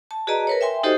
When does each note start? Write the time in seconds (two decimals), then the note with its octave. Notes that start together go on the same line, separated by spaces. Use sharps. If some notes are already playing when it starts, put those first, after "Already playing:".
0.11 A5
0.27 F#4 G#4 B4 D5 D#5 A#5
0.47 A#4 B4 C#5
0.61 E5 G5 G#5 C6
0.83 D#4 F#4 G4 A4 C5 D#5